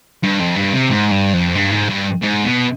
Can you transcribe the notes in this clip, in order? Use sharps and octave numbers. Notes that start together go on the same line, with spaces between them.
G2
F2
G2
C3
G#2
G2
F2
G2
G#2
G2
G#2
B2